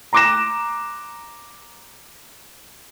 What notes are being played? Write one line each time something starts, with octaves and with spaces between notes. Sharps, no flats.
A#5 C6 D6 F#6 A#6 E7